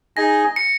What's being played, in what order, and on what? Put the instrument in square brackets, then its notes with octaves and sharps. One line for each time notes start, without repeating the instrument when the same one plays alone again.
[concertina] D#4 G#4 D#5 G#5 [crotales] A#6
[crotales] C#7